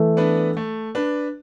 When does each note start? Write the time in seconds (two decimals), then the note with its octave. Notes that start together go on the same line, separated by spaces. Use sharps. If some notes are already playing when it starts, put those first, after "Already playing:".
Already playing: E3 A3
0.17 B3 D4 B4
0.57 A3
0.95 D4 B4